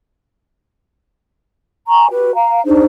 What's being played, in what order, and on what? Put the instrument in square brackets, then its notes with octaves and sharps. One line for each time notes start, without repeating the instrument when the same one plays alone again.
[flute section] G#5 A#5 C#6
F#4 G4 B4
F5 A#5
D4 D#4 G#4 C5